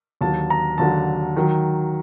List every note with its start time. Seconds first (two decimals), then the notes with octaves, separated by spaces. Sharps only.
0.21 D#2 D3 F#3 A5
0.50 A#5
0.78 D#2 D3 F#3 A5
1.36 D#3 F#3